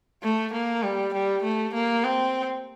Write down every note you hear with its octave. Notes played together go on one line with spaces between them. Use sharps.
A3
A#3
G3
G3
A3
A#3
C4